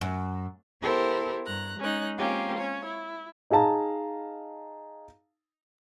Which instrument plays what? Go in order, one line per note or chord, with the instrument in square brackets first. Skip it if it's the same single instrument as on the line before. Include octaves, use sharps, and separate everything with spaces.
[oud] F#2
[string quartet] B3 E4 G4 A4 A#4 C5
G2 A#5 F#6
G#3 C#4 D#4 F#6
G#3 A#3 C4 C#4 F4 G4
C#4 C#5
E4
[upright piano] D#4 G#4 F5 A5 A#5